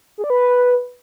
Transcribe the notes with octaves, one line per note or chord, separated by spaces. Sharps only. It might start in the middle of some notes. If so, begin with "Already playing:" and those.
G#4
D5
B4